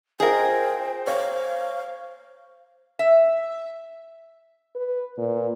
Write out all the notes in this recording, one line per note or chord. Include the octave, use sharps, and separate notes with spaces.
F4 G#4 A#4 C5 D#5 G5
C#5 F5
E5
B4
A#2